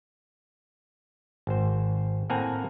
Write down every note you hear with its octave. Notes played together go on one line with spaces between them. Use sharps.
G#1 C5
A2 A#3 C4 F#5 G#5 A#5